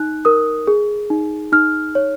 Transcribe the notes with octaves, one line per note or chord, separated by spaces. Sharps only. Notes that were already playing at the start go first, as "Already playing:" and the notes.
Already playing: D#4 F#6
A#4 D#6
G#4
D#4
D#4 F6
C#5